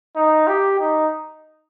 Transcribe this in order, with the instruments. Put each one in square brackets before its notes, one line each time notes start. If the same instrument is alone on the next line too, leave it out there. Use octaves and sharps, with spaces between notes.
[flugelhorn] D#4
G4
D#4